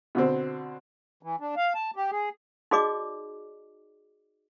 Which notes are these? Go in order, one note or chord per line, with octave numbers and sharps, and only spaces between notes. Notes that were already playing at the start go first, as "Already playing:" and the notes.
B2 D3 C4
E3
D4
F5
A5
G4
G#4
D#4 F#4 G#4 D5 D#5 D6